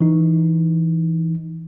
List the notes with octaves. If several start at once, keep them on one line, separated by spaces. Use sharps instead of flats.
E3 D#4